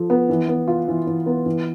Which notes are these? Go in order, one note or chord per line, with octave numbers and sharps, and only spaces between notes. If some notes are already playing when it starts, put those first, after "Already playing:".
Already playing: F3 A4
B3
E3
B3
F4
E3
E3
B3
E3